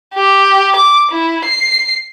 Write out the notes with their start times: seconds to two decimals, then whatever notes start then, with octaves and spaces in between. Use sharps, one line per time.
0.14 G4
0.76 D6
1.11 E4
1.45 C7